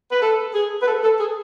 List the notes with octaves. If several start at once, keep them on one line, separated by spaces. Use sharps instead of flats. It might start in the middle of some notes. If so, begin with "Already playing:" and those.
B4
A4
G#4
B4
A4
A4
G#4